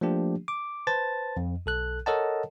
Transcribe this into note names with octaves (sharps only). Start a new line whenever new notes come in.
F3 A3 A#3 D4 G4
D6
B4 C5 A5 A6
F2
B1 A4 F#6
A4 A#4 C#5 D#5 F#5 A5